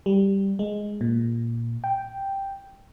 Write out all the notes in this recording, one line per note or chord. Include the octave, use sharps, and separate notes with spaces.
G3
G#3
A#2
G5